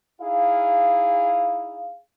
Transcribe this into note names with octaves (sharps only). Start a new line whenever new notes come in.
D#4 E4 G#4 F5